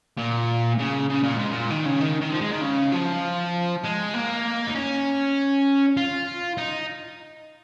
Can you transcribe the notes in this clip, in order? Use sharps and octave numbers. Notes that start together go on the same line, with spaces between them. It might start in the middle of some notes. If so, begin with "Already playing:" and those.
A#2
C#3
C#3
A#2
G#2
A#2
D#3
C#3
D#3
D#3
F3
G#3
D#3
C#3
F3
G#3
A#3
D#4
C#4
F4
D#4